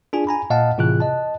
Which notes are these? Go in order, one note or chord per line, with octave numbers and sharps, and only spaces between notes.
D4 F4 G#4 G#5
G#5 A#5 B5
A#2 D#5 F5 F#5 A5
A2 C3 E3 F4 G#4 F#6
D#5 A5